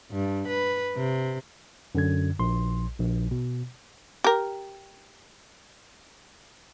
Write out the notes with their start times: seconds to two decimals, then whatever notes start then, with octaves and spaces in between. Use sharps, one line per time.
0.12 G2
0.48 B4
0.97 C3
1.95 F#2 D3 G#6
2.39 A#1 C6
2.99 A#1
3.31 B2
4.24 G4 A#4